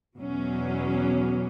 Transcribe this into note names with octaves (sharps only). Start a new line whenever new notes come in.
E2 B2 F#3 C#4